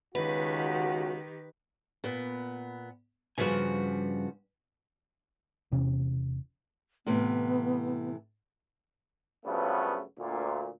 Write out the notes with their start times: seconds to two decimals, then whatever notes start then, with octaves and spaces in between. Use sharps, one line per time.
0.15 C#2 D#3 F#4 G4 B4
2.04 A#2 B3
3.38 G2 C#3 F3 F#4 B4 G#5
5.72 E1 E2 C3 C#4
7.06 A2 C3 E3 B3
9.46 G2 C#3 F3 F#3 A3 B3
10.19 D2 A#2